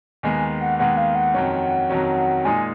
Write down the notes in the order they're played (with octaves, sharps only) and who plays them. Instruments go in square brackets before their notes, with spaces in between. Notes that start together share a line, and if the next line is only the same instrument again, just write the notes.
[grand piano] D#2 D#3 G#3 B3 [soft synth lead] G#5
[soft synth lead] F#5
[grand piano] D#2 D#3 G#3 B3 [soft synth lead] F#5
[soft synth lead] F5
F#5
[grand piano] F2 D#3 F#3 C#4
F2 D#3 F#3 C#4
[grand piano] A#2 G#3 D#4 [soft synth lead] G#5